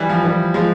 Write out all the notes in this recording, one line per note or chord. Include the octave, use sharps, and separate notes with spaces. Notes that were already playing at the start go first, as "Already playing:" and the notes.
Already playing: E3 G3
F3
E3 G3
F3 G#3